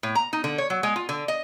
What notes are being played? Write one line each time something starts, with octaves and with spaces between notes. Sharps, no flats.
A2
A#5
D#4
D3
C#5
F#3
G#3
F4
D3
D#5